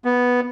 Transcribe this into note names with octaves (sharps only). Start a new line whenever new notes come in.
B3